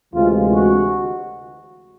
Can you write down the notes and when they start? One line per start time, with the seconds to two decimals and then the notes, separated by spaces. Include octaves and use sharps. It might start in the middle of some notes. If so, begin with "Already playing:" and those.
0.13 D2 C3 E3 G#3 F4
0.53 F#4